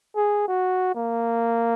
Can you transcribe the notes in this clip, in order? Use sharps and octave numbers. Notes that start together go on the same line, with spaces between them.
G#4
F#4
A#3